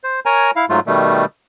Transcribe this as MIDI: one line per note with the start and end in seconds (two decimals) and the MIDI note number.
0.04 0.20 72
0.26 0.51 70
0.26 0.51 73
0.26 0.51 80
0.26 0.51 82
0.56 0.65 64
0.56 0.65 77
0.69 0.80 44
0.69 0.80 54
0.69 0.80 57
0.69 0.80 65
0.87 1.25 47
0.87 1.25 51
0.87 1.25 55
0.87 1.25 57